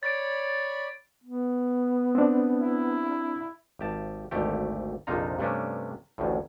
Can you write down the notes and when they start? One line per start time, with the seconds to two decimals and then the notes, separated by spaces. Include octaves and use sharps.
0.03 C#5 D5 B5 A6 D7
1.24 B3
2.15 C4 D4
2.61 E4
3.79 G#1 G4 A5
4.31 G#1 D2 A3 G4
5.07 A#1 F2 C3 D#4 F4 A#5
5.39 G2 C3 A3 C#4 D4
6.18 A1 D2 A2